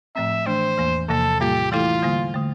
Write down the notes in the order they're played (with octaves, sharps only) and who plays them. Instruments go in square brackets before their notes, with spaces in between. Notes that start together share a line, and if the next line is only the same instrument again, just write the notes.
[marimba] A2 F3 A3 C4 [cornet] E5
[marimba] E3 A3 D4 [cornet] C5
[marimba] E2 E3 A#3
[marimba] E2 C3 F3 A#3 [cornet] A4
[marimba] A2 G3 A#3 F4 [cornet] G4
[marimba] E3 A3 E4 A4 [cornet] F4
[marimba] D3 G3 A#3
D3 A3